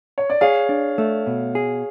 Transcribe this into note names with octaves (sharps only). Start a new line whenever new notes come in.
C#5
D5
G#4 C#5 F5
D4
A3
B2
G#4